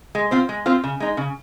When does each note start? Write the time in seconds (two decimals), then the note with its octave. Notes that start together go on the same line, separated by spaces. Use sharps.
0.15 G#3
0.31 C4 F4 C5
0.49 G#3
0.66 C4 F4 C5
0.84 C#3
1.00 G#3 D#4
1.17 C#3